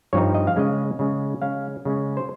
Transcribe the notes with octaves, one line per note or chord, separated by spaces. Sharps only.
G2 F3 C4 D#4 C#5
D#5
F5
C#3 G#3 C#4 D#5
C#3 G#3 C#4
C#3 G#3 C#4 F5
C#3 G#3 C#4
C5